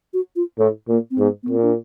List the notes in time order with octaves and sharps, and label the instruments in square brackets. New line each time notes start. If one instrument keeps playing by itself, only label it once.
[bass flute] F#4
F4
[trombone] A2 [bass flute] E4
[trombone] A#2 [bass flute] A#3
[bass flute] C4
[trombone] G#2 [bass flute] B3
[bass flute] B3
[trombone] A#2 [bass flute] C4
[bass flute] D4